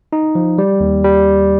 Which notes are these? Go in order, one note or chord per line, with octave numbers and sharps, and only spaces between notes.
D#4
F3
G3
D#2
G3